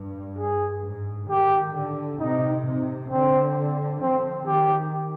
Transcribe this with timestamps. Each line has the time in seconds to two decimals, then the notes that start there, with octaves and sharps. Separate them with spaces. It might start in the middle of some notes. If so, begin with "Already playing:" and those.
Already playing: G2
0.38 G#4
0.83 G#2
1.29 D#3 G4
1.74 D3
2.20 C3 D#4
2.65 C3
3.10 D3 C4
4.01 F3 C4
4.46 D#3 G4